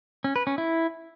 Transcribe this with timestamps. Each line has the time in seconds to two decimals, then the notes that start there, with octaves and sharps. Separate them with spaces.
0.24 C#4
0.36 B4
0.47 C#4
0.58 E4